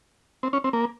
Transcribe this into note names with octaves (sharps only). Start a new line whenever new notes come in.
C4
C#4
C4
A#3